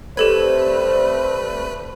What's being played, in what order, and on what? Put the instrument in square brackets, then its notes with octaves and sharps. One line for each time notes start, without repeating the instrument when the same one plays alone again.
[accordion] G3 A3 C4 [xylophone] G4 A4 G#6 [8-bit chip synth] B4 [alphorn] C5